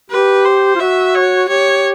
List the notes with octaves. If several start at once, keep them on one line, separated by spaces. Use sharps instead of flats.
G4 B4
C5
F4
F#4 E5
C#5
G4 C#5